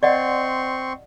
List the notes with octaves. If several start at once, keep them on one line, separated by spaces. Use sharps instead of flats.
C4 D5 D#5 F#5 C6 C#6